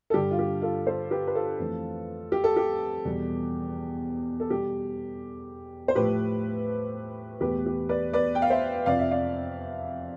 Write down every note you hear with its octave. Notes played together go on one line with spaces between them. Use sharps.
A4
G2 D3 G3 G4
F4
G4
F4 A4
A4 C5
G4 B4
B4
F4 A4
F2 E3 A3
G4
A4
G4
E2 B2 G3
A4
B2 G3 G4
C5
A2 F3 A3 G4 B4
E2 B2 A3 G4 B4
G4
B4 D5
B4 D5
G5
F5
C5 E5
F2 C3 F3 D5 F5
E5
D5 F5